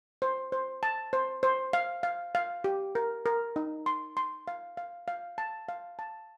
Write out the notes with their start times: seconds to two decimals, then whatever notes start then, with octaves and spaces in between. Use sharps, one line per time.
0.22 C5
0.52 C5
0.83 A5
1.13 C5
1.43 C5
1.73 F5
2.03 F5
2.35 F5
2.64 G4
2.95 A#4
3.26 A#4
3.56 D#4
3.86 C6
4.17 C6
4.48 F5
4.77 F5
5.08 F5
5.38 A5
5.69 F5
5.99 A5